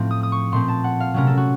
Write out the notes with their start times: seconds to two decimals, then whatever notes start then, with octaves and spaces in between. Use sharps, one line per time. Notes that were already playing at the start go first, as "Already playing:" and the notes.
Already playing: A2 F3 A3 C4
0.11 D#6
0.23 D#6
0.32 C#6
0.52 A#2 A3 C4 C6
0.68 A5
0.84 F#5
1.00 F5
1.14 C3 F#3 A3 C#4 A#4
1.27 A4
1.37 F#4